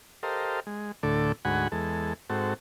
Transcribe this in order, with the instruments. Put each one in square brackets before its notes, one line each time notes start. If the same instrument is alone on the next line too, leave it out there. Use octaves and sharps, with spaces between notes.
[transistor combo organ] G4 A4 A#4 C5 D#5 F5
G#3
D2 A2 D3 A4 D6
D2 G#2 F#4 F#5 G#5 B5
E2 G#3 A4
G#2 C4 F#4 A4